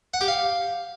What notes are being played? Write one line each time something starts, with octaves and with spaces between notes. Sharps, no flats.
F#5
G4
F5